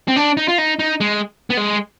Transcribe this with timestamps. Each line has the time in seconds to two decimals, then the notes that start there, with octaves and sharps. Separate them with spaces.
0.08 C4
0.16 D4
0.37 D#4
0.48 F4
0.58 D#4
0.79 D#4
1.00 G#3
1.50 B3
1.57 G#3